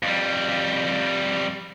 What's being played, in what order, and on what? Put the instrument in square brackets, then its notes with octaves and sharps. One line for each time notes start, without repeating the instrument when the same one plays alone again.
[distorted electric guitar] F2 G3